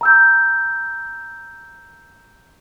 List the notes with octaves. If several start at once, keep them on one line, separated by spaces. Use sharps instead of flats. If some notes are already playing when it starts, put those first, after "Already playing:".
A#5 E6 G6